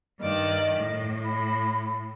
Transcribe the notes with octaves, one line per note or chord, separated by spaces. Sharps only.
G2 D#3 D5 D#5
A2
B5